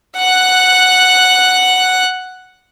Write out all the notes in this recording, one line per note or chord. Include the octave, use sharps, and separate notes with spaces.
F#5 F#6